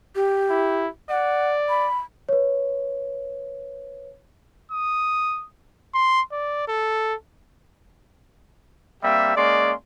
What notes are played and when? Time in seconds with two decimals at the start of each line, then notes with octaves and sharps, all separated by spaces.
0.15 G4
0.50 E4
1.10 D5 F#5
1.69 B5
2.29 B4 C#5
4.71 D#6
5.94 C6
6.32 D5
6.68 A4
9.04 G3 A#3 C4 G4 E5
9.36 G#3 A#3 C#4 D5 C6